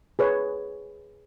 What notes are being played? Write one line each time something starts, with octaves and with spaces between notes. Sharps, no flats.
G#4 B4 C#5